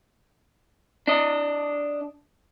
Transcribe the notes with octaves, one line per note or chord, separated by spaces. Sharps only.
D4 D#5